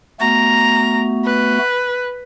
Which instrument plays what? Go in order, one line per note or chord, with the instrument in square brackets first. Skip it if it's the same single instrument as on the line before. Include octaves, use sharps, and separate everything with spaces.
[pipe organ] A3 B3 F#4 [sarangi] A#5
[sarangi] B4